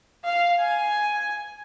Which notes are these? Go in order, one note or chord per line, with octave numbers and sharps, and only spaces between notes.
F5
G#5